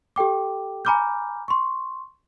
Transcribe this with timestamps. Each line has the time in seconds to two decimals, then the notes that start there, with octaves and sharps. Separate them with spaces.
0.16 G4 A4 G5 D6
0.85 G#5 A#5 B5 D6 F6 G6
1.48 C6 C#6